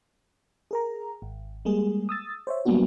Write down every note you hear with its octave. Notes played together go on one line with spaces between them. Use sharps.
G#4 A#4 A#5
G#1
G3 G#3 A#3 G#4
D#6 E6 A6
C5 C#5 E5
F#3 G3 A#3 B3 D4 F#4